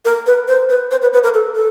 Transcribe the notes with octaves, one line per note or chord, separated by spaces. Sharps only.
A#4
B4
C5
B4
C5
B4
B4
A#4
A4
A4